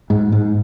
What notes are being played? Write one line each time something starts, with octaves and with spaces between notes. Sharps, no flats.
G#2
G#2